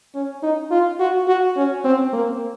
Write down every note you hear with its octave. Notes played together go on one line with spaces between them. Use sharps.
C#4
D#4
F4
F#4
F#4
C#4
C4
A#3